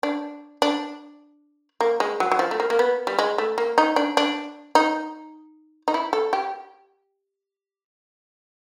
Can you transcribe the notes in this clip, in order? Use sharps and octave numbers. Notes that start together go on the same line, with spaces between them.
D4
D4
A#3
G#3
F#3
F#3
F3
A3
A#3
A#3
B3
G3
G#3
A3
A#3
D#4
D4
D4
D#4
D#4
E4
A4
G4